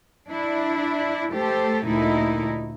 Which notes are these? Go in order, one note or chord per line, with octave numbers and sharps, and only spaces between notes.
D4 E4
A3 G4 A4 C5
D2 A#2 A3 D#4 E4